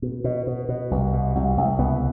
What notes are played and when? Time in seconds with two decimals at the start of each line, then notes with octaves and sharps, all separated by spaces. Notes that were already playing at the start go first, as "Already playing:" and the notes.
0.02 B2
0.24 B2
0.47 B2
0.69 B2
0.91 C2
1.13 B2
1.35 C2
1.57 C2
1.79 C#2 B3